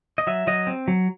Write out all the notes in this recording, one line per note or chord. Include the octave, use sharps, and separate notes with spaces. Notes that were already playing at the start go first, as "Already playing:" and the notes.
D#5
F#3 E5
F#3 D#5
C4
F#3